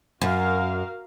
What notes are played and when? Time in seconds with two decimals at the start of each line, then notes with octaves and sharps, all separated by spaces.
0.22 F#2 F#4 A#4 F5